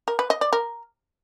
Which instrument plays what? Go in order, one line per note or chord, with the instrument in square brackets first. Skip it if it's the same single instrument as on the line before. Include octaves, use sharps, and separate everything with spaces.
[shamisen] A#4
B4
D#5
D5
A#4